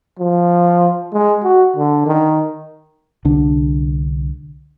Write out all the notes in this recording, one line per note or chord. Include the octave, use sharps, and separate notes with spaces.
F3
G#3
F#4
D3
D#3
C2 D3 D4